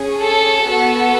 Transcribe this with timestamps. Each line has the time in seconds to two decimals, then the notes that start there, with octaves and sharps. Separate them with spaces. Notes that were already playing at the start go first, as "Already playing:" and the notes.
Already playing: C#4 G#4
0.18 A4
0.65 B3 F#4 A4